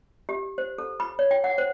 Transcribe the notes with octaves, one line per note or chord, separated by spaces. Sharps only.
G4
C5
A4
B5
C#5
G5
F#5
C5